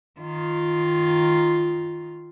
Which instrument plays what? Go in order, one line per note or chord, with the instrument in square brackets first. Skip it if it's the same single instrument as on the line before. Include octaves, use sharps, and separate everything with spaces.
[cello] D#3 F4